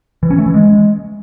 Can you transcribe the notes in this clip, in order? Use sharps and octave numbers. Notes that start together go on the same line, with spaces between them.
E3
C#4
A3
E3
G#3